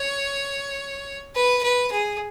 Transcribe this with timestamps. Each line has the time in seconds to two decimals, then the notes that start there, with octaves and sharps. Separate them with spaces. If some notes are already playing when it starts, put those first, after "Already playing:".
Already playing: C#5
1.35 B4
1.63 B4
1.92 G#4